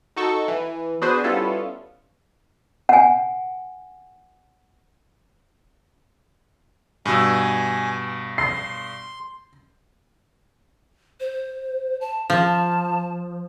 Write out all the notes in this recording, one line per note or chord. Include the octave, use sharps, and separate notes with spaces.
D#4 F#4 A4 C#6 E6
E3
B3 D4 F#4 G#4 B4 C5
G3 B3 C#4 E4 F4 A4
F#5 G#5
G2 B2 G#5 E6
C6 C7
C5
A5
F3 A5